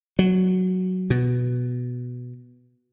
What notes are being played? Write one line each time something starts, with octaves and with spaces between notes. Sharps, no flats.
F#3
B2